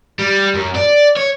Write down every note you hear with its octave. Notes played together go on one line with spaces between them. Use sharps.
G3
F#2
D5
C#5